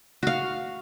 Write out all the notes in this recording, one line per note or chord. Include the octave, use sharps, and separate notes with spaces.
F#4 F5